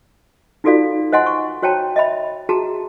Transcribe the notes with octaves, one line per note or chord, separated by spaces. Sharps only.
D#4 F4 F#4 A4 D5 F5
C5 D#5 F#5 G#5 C6
C#6
F#4 C5 C#5 G5 A5 A#5
D#5 E5 B5
F#4 G#4 A5 A#5